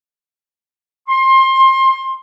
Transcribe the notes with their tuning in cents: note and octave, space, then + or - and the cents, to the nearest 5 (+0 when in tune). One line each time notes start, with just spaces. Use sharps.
C6 +25